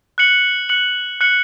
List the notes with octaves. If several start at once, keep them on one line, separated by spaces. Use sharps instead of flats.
F#6 C#7 F#7
F#6 C#7 F#7
F#6 C#7 F#7